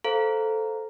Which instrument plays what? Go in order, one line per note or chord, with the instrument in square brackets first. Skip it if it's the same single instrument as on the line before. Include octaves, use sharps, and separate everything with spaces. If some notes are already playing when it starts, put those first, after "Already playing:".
[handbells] A4 [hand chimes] C5 F5 A#5